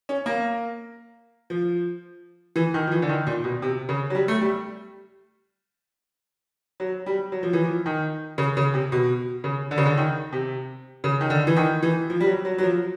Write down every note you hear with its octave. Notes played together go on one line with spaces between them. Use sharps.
C#4
A#3
F3
E3
D#3
F3
E3
D3
D#3
A#2
B2
C3
C#3
F#3
G3
A3
G3
F#3
G3
F#3
F3
E3
F3
D#3
C#3
C#3
C3
B2
C#3
D3
C#3
D3
D#3
C3
C#3
D#3
D3
E3
D#3
E3
F3
G3
F#3
F#3
F#3
F3